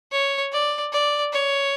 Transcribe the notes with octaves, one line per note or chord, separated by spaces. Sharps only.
C#5
D5
D5
C#5